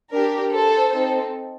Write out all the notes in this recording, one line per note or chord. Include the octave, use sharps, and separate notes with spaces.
D4 G4 A#4
A4 C5
C4 D#4 A4